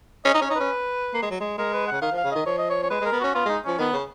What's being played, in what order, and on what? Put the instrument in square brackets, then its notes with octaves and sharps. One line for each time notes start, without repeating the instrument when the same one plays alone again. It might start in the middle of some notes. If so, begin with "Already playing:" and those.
[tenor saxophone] C#4 [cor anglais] D#5
[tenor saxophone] D#4
[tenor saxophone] C#4 [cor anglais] C#5
[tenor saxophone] D#4
[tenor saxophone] C#4 [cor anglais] B4
[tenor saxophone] A#3
G#3
F#3
G#3
[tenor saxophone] G#3 [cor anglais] A#4
[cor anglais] B4
F#5
[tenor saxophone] C#3
[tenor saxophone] D#3 [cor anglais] F5
[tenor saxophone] F3 [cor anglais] F5
[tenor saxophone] C#3
[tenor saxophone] D#3 [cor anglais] D#5
[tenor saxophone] F3 [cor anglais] C#5
[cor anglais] D#5
C#5
C#5
[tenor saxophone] G#3 [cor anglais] B4
[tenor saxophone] G#3 [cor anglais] A#4
[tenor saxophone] B3
[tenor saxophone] C#4 [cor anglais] F#4
[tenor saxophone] B3 [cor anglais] F4
[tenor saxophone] G#3 [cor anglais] D#4
[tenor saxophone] F3 [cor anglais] C#4
[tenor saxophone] D#3 [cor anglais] B3
[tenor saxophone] C#3